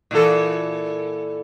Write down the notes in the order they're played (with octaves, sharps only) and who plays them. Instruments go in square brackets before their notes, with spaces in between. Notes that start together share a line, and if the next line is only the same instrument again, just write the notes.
[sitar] A#2 E3 A4